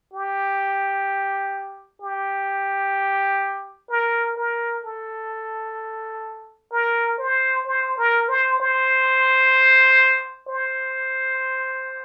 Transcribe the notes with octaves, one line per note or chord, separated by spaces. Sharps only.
G4
G4
A#4
A#4
A4
A#4
C5
C5
A#4
C5
C5
C5